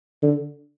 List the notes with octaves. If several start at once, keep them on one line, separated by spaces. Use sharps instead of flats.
D3